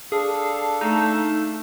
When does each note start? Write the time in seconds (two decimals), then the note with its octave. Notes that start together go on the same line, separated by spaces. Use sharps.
0.12 D4 G#4 A4 F5
0.81 A3 D#4